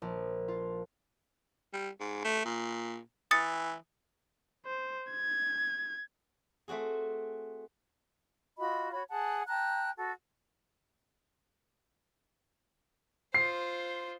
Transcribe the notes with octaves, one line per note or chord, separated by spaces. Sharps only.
A#1
F4
G3
G#2
A3
A#2
E3 D#6 A6 C#7
C5
G#6
A3 C4 F#4 G#4
F4 F#4 D#5 B5
F#4 C#5 B5
G#4 F#5 A5
G5 A5 A#5 F#6
F#4 A4
F4 C5 C7